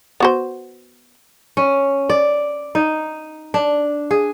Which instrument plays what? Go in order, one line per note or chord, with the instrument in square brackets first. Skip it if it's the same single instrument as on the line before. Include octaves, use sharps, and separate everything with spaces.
[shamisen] B3 F#4 C5
[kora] C#4
D5
D#4
D4
G#4